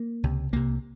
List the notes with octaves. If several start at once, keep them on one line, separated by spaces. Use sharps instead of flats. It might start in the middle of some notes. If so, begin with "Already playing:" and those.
Already playing: A#3
C#2 C3
C2 C3 A#3